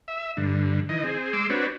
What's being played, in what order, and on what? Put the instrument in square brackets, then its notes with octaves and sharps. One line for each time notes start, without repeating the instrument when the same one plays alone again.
[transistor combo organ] E5
G2 D3
D#3 E3 D#5
C4 G#4
G#3 C6 D6 E6
C4 D4 F#4 B4 C#5